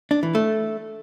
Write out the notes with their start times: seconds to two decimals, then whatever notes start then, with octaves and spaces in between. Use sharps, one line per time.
0.11 D4
0.23 E3
0.35 A3